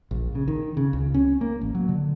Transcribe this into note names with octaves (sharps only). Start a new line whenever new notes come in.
A#1
C#3
D#3
C#3
C#2
C#4
A#3
A1
F#3
D3